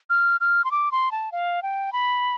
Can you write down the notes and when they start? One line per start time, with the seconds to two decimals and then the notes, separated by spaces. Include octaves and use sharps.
0.10 F6
0.40 F6
0.64 C6
0.71 D6
0.92 C6
1.12 A5
1.32 F5
1.63 G5
1.93 B5